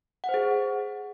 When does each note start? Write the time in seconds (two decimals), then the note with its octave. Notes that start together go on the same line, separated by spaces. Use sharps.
0.24 F#5
0.29 C5
0.34 G#4